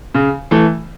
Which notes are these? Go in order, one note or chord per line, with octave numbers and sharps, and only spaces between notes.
C#3
E3 A3